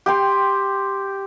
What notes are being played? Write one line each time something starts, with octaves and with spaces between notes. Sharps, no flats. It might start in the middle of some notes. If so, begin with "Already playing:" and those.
G4 G5 C6